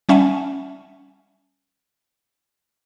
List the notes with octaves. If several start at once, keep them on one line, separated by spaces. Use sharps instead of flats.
G3 C#4 E5 F#5 G#5 A5